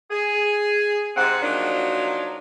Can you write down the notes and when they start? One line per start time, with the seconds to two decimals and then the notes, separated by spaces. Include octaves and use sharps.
0.11 G#4
1.16 G#2 C3 C4 F#5
1.43 F3 F#3 A#3 D4 D#4 F#4